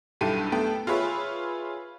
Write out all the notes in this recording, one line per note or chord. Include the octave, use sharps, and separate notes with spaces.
B1 G2 E4 G4 A4 D#7
A3 B3 G5 A5
F4 G#4 B4 C#5 E5